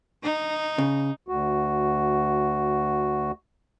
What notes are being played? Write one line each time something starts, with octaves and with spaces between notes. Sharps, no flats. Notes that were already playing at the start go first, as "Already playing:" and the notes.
D#4
C#3
D2 F#4